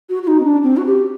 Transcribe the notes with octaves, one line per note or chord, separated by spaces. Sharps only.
F#4
F#4
D#4
C4
D4
C4
F#4
G4